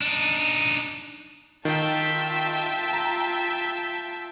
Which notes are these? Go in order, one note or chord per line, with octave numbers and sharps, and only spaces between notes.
D4 D#4
D#3 F4 E5 G5 A5
A#5